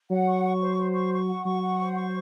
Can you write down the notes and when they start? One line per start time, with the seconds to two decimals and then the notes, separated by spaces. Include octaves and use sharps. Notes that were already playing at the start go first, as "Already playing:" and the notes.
0.10 F#3 F#5
0.28 C#6
0.45 C#6
0.61 C5
0.78 C5
0.94 C#6
1.12 C#6
1.28 F#5
1.45 F#3 C#6
1.62 F#5
1.79 C5
1.97 C#6